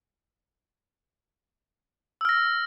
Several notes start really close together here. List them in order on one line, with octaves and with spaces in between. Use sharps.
E6 F6 A#6